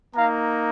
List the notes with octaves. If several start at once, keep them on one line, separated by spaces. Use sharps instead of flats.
A#3 D#4 F5 A#5